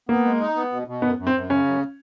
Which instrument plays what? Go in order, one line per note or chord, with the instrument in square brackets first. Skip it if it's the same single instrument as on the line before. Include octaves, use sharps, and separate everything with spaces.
[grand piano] A#3 [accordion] B3
[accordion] G#3
D#4
B3
B2
B2
[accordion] F#2 [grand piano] B3
[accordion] F#2
[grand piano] C4
[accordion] F#2
[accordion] C#3 [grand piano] C#4
[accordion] F#2